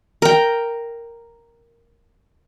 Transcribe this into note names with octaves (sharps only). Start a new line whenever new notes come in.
A#4 G5